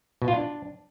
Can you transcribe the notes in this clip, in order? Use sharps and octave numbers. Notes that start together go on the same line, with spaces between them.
B2
F4
D4